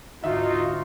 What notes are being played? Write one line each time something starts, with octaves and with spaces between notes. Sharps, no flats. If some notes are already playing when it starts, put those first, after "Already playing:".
D2 G#2 D#4 F4 F#4 E5